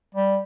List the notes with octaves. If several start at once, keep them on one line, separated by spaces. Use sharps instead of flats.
G3